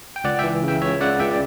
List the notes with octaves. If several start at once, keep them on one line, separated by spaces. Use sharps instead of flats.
G5
C#2 D5 F#5
E3 E5 G5
C#3 E5 G5
C#2 C#5 E5
C#3 D5 F#5
C#2 E5 G5
D5